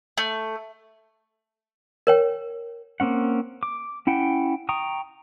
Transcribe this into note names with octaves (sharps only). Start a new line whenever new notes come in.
A3
A#4 C#5 G5
A#3 C4 C#4 F#5
D6
C#4 E4 F#5 G5
G5 A#5 C#6 D#6